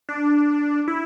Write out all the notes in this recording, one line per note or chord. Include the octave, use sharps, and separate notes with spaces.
D4
E4